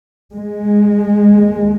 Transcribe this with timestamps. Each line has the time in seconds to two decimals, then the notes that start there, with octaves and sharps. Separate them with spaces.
0.33 G#3
1.28 D#2